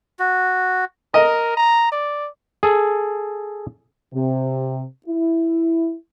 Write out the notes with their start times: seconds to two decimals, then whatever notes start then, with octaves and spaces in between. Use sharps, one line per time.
0.19 F#4
1.14 A#4 D#5
1.57 A#5
1.92 D5
2.63 G#4 A4
4.14 C3
5.07 E4